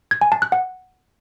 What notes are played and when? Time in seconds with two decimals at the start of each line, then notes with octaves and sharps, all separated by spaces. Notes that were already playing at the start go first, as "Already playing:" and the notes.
0.11 G#6
0.21 G#5
0.32 A5
0.42 F#6
0.52 F#5